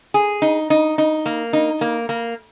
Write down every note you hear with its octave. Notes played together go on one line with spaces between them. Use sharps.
G#4
D#4
D#4
D#4
A#3
D#4
A#3
A#3